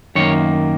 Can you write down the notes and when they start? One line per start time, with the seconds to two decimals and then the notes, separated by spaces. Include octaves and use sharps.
0.15 F#2 D#3 A#3 C#5